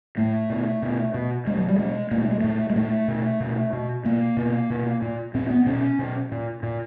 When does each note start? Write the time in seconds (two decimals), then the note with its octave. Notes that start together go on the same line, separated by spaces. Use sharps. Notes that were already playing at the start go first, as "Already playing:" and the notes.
0.17 A2 A3
0.50 B2
0.82 B2
1.14 B2
1.47 B2 G#3
1.57 F#3
1.69 G3
1.79 B2 G#3
2.11 B2 A#3
2.21 A3
2.31 G#3
2.41 A#2 A3
2.70 G#3
2.76 A#2 A3
3.08 B2
3.40 B2
3.73 B2
4.05 B2 A#3
4.37 B2
4.70 B2
5.02 A#2
5.34 A#2 C4
5.50 B3
5.66 B2 C#4
5.99 B2
6.32 A#2
6.63 A#2